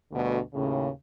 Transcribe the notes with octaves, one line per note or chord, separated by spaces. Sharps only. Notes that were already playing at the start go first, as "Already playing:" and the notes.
D2 G2 B2 D3 A3
D#2 A2 C#3